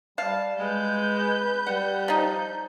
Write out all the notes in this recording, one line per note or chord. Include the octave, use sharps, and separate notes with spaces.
G3 F5 A5
G#3 B4 G6
G3 F#5
F3 D#4